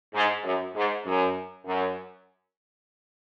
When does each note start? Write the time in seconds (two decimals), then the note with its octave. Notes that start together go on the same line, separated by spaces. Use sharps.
0.14 G#2
0.44 F#2
0.76 G#2
1.06 F#2
1.66 F#2